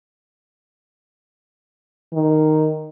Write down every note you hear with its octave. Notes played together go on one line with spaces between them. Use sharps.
D#3